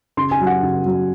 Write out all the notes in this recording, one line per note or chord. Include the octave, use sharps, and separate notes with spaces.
C#3 C6
G#5
F#3
F#5
C#3
F#3